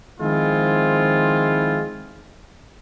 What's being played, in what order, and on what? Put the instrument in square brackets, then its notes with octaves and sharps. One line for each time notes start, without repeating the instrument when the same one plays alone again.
[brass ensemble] D#3 F3 G#3 C4 E4 F4